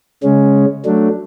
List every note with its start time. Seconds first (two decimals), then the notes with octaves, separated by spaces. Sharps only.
0.24 C#3 G#3 C#4
0.85 F#3 A3 D4